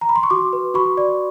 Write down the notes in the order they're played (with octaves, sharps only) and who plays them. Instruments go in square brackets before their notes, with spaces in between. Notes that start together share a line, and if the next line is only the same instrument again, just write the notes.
[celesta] A#5
B5
C6
C#6
F#4 C6 D6
B4
F#4 B5 C#6
D5